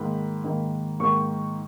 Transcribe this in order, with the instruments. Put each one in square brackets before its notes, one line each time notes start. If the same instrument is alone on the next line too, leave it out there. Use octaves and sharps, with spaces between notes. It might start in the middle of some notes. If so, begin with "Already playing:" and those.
Already playing: [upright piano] G#2 D#3 A#3 B5
G#2 D#3 A#3
G#2 D#3 A#3 C#6